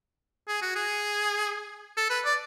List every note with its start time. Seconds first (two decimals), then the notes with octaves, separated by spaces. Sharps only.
0.48 G#4
0.62 F#4
0.75 G#4
1.97 A4
2.10 B4
2.25 D5